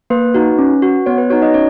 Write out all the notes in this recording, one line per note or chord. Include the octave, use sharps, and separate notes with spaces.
A#3 B4
D#4 F#4
C#4
F#4
B3 C#5
B4
D#4 F#4 C#5
D#4 D#5
C#4 C#5